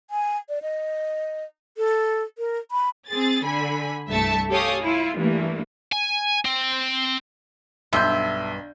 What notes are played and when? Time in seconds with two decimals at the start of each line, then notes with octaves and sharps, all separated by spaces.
0.10 G#5
0.49 D5
0.62 D#5
1.77 A4
2.38 A#4
2.71 B5
3.09 C4 G#4 A6
3.44 D3 G#5 B5
4.09 C2 G2 A3 E5 A5 C#7
4.50 G4 A4 C#5 F5 G#5 D#6
4.81 E4 F4
5.16 G2 E3 A3 A#3
5.92 G#5
6.45 C4
7.93 B1 G2 E5 C6 G6